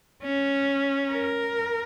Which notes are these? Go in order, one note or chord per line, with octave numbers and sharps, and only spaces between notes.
C#4
A#4